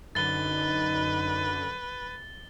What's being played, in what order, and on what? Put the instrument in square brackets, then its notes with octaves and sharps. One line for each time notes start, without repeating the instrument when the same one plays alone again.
[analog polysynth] F#2 D3 [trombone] D#4 [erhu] B4 [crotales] A6 G7